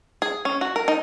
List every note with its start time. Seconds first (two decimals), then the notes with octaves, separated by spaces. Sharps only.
0.22 G#4
0.45 C#4
0.61 F#4
0.76 A#4
0.88 D#4